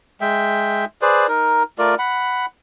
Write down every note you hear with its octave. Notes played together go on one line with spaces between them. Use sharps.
G#3 E5 G5
G#4 B4 C5 D5
D#4 A#4
A3 F4 A#4 D5
F#5 B5